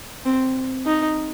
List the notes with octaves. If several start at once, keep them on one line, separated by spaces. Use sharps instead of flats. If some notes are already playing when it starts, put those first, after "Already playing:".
C4
D#4